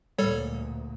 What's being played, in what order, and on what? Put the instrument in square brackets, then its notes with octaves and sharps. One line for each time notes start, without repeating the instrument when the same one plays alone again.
[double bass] D2 A#2 [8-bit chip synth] G3 A4 C#5